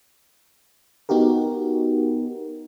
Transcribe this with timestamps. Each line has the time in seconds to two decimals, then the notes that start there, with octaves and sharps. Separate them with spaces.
1.09 B3 D#4 F#4 G4 A#4